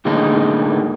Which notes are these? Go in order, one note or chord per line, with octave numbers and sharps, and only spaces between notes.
A2 D3 G#3 A#3 D#4